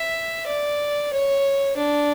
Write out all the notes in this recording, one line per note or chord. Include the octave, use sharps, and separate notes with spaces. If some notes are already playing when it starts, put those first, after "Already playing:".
Already playing: E5
D5
C#5
D4